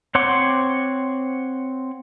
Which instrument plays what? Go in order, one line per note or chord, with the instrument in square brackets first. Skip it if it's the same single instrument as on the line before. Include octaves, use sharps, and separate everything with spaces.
[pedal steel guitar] C4 C#5 F#5 C6 D6